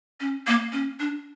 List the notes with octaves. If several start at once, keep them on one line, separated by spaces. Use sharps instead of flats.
C#4
A#3
C#4
D4